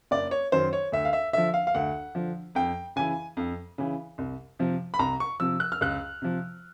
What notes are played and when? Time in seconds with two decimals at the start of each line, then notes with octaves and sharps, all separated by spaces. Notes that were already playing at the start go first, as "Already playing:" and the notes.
0.11 F#1 D5
0.31 C#5
0.52 F#2 D#3 F#3 C5
0.73 C#5
0.92 D2 E5
1.05 F5
1.13 E5
1.33 D3 F3 E5
1.54 F5
1.67 F5
1.75 D2 F#5
2.15 D3 F3
2.55 F2 G5
2.96 C#3 E3 G#5
3.37 F2
3.78 C#3 E3
4.18 C2
4.59 C3 F3
4.94 B5
4.99 C2 A#5
5.20 C#6
5.40 C3 F3 E6
5.60 F#6
5.72 F6
5.81 C#2 F#6
6.22 C3 F3